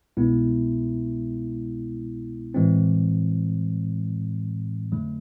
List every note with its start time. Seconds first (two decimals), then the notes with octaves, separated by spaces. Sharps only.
0.17 C2 B2 G#3 B3 E4
2.54 A2 E3 G#3 C4
4.92 F2 D3 F#3 A3